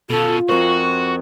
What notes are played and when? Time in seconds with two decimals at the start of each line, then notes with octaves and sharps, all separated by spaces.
0.10 B2 C#4 F4 A4
0.49 F2 F#4 A#4 C5 C#6